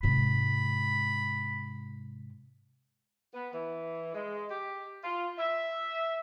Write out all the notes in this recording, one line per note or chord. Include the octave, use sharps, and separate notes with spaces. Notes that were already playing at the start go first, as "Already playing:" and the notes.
G#2 C3 B5
B3
E3
G#3
G4
F4
E5